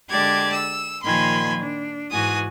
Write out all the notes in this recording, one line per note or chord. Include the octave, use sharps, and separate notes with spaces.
D3 G#3 G4 D5 A5 G#6
E6
A#2 D#3 F3 G#5 B5 C6
D4
G#2 E3 F#4 G#5 D#6